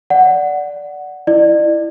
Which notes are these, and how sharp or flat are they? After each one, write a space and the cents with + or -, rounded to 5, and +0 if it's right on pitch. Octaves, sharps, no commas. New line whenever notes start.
D5 -5 F#5 +0
E4 +5 D5 +35